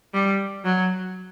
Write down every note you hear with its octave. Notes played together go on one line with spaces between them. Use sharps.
G3
F#3